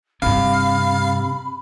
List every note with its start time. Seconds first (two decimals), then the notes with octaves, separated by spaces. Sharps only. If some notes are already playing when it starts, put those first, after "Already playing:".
0.22 G2 C3 D4 F5 B5